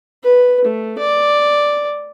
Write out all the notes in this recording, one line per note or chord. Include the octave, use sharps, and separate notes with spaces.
B4
A3
D5